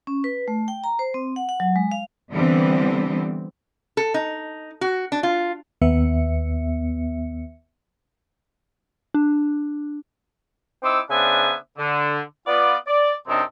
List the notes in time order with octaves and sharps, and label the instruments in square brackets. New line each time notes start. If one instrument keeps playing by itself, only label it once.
[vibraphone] C#4
B4
A3
G5
A#5
C5
C4
F#5
F#5
F#3
G#3
F5
[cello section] D3 E3 G3 B3 C4
[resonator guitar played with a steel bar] A4
D#4
F#4
D4
F4
[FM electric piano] D#2 B3 E5 C#7
[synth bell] D4
[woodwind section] C4 D#4 E4 C6 D6 E6
C#3 B3 D4 C5 E5 G#5
D3
B3 F4 D5
D5
F#2 C3 C4 D4 D#4